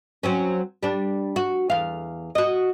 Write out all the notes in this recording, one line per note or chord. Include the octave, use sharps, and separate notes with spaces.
F#3 C4 C#4
G3 D4
F#4
E2 F5
F#4 D#5